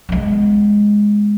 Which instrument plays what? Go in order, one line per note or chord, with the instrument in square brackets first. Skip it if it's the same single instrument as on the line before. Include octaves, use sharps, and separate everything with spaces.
[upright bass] G#3 B3